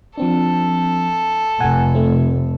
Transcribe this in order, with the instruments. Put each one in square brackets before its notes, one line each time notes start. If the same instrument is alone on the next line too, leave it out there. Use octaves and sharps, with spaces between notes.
[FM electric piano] F3 C4 D4 [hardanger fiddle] A4
[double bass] F1 [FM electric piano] F#5 G#5
[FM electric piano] A3 C4